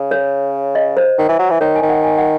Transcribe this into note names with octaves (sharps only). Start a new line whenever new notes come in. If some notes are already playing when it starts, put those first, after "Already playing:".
Already playing: C#3
C#5
D#5
C5
D#3
E3
F#3
E3
D#3 C#5
G#5
D#3
F#5
G#5
F#5